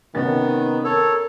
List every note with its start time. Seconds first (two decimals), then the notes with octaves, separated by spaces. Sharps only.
0.15 C3 D#3 B3 C#4 A6
0.84 A4 A#4 C#5